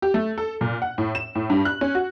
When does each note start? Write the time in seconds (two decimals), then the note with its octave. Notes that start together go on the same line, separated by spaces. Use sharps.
0.02 G4
0.14 A3
0.38 A4
0.61 A#2
0.82 F#5
0.98 A2
1.15 E7
1.35 A2
1.50 G2
1.65 F#6
1.81 C#4
1.95 F#4